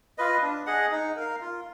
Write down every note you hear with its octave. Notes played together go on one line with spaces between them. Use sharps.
F4 B4 D#5
D4
G#4 D#5 F#5
D#4
A#4 F5
F4